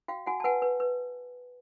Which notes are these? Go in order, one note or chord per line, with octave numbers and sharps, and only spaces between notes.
F#4 F5 G5
F#4 F#5 G#5
A5
B4 F#5 G#5
B4
B4